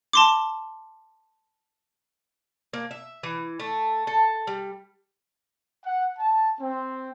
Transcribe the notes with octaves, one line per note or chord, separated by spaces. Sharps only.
A5 C6 D6
A#3
E5
E3
A3
A4
G3
F#5
A5
C4